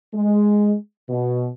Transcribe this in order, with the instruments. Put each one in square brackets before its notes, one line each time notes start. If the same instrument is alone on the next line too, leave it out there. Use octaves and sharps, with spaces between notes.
[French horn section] G#3
B2